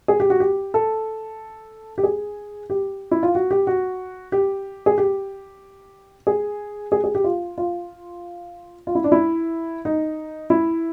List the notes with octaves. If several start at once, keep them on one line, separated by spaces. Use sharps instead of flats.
G#4
G4
F#4
G4
A4
G4
G#4
G4
E4
F4
F#4
G4
F#4
G4
G#4
G4
G#4
G#4
G#4
G4
F4
F4
F4
E4
D4
E4
D#4
E4